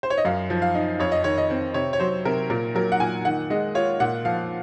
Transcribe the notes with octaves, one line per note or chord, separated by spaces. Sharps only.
C5
C#5
D#5
F#2 F5
F3
F5
D#4
F2 C#5
D#5
D#3 C#5
D#5
C4
C3 C#5
C#5
F#3 C5
C3 A#4
A#2 A#4
F#3 A#4
F#5
A#2 G#5
D#3 F#5
G#3 D#5
F4 C#5
A#2 F#5
F3 F5